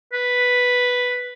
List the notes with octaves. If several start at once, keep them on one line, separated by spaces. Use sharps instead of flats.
B4